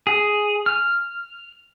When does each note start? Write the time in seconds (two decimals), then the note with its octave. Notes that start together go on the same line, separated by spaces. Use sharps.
0.07 G#4
0.66 F6